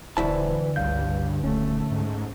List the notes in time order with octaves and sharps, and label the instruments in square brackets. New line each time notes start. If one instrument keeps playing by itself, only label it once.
[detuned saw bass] D#1 [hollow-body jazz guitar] D2 E4 A5 [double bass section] E3 [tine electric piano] C5
[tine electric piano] G1 F5 G6 [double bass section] C#2 [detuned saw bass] G2
[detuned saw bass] D#1 [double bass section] A3 [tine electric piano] C#4
[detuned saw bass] G#2